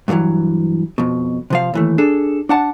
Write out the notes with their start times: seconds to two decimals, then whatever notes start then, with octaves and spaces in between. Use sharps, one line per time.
0.08 G2 A#2 D3 E3 F#3
0.98 F2 B2
1.50 C3 F3 F5
1.74 D#2 E3 A3
1.98 D4 G#4 A4
2.49 D4 F#5 A5